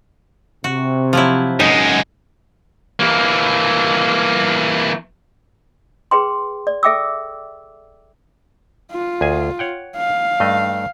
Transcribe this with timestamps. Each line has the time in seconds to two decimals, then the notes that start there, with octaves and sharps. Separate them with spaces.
0.64 C3 F#4
1.13 F3 F#3 E4
1.60 F#2 G#3 D#4
3.00 E3 A#3
6.11 G#4 B4 G5 C6
6.67 D5
6.83 A4 E5 G5 D6 E6
8.91 F4
9.21 D2 G#4 G#5
9.59 C#5 F#5 G5
9.97 F5
10.40 G2 A3 D#5